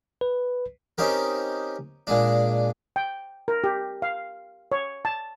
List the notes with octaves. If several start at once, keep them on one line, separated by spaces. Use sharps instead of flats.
B4
C4 C#4 D#4 G4 A#4
A#2 G#3 D4
G5
A#4
G4
F5
C#5
A5